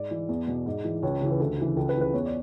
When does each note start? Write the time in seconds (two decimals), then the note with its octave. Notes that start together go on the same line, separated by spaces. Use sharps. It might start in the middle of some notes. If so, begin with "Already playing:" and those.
Already playing: G#2 D5
0.11 E3
0.29 E2
0.48 B2
0.66 G#2
0.85 E3
1.03 C#2 C#5
1.21 C#3 E3
1.31 B4
1.40 D2 A4
1.58 C#3 E3
1.76 C#2 A4
1.89 B4
1.95 E3
2.00 C#3 B4
2.14 E2 C#5
2.26 D5